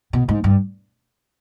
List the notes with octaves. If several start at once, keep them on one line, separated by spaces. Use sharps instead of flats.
B2
G#2
G2